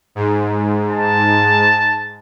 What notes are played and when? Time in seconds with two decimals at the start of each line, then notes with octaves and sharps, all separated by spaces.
0.15 G#2
0.91 A5